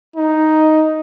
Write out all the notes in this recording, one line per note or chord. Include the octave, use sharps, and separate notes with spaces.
D#4